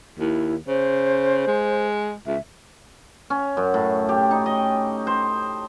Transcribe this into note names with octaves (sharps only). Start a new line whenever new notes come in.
D#2 E4
C#3 C5
G#3
C#2 E5
C#4
F#2
A2
G4
D#4
D#5
C5